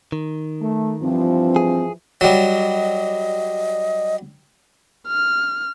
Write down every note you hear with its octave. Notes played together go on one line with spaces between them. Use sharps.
D#3
A3
G2 E3 F3 C4
G#4
F#3 G3 D#5
F6